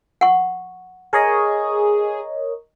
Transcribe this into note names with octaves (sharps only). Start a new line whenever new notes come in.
F#5 C#6
G#4 A#4 C#5 D#5